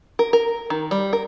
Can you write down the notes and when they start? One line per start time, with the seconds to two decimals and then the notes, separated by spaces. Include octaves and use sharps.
0.19 A#4
0.33 A#4
0.70 D#3
0.91 G3
1.13 A#4